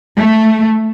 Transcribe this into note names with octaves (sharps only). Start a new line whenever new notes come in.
A3